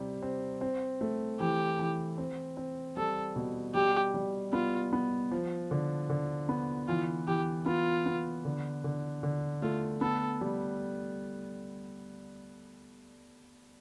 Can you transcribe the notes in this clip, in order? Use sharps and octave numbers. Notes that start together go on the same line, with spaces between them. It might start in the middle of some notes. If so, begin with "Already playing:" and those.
Already playing: C3 G3
C4
C4
A3
E3 G4
E3
C4
C4
G3 A4
B2
G3 G4
G3
B3 F4
B3
F3
D3
D3
B3
E3 F4
E3 G4
B3 F4
B3
D3
D3
D3
A3 F4
B3 A4
G3